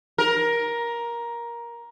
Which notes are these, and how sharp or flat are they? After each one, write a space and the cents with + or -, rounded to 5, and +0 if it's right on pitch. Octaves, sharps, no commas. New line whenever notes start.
A#4 +15